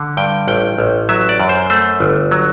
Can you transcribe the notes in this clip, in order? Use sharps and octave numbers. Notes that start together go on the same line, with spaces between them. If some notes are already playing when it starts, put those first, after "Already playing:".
Already playing: D3
G2 G5
A1 G5
A1
F#3 E5
D5
F#2
C5
A3 C5
G1
F#3